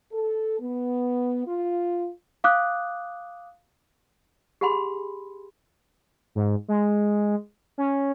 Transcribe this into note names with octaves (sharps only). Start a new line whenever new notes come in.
A4
B3
F4
F5 D6 D#6 F#6
G4 G#4 F#5 G#5 B5 C6
G#2
G#3
C#4